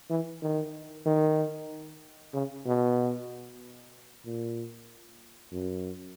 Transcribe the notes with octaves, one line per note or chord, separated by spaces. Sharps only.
E3
D#3
D#3
C#3
B2
A#2
F#2